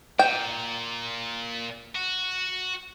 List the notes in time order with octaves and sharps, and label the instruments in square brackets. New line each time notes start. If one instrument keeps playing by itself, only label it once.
[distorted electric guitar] A#2 [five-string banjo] G5
[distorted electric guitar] F#4